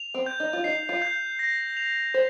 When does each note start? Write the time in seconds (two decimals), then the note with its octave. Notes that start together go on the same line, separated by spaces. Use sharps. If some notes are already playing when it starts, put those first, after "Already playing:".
Already playing: F7
0.14 C4
0.26 G6
0.40 D#4
0.53 F4
0.64 D#4 C7
0.89 F4
1.02 G6
1.39 A#6
1.77 F7
2.14 C5